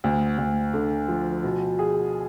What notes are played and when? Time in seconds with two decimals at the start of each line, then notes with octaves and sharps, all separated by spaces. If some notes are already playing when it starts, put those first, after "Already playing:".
0.04 D2
0.38 D2
0.74 D3
1.08 F3
1.44 B2
1.79 G#4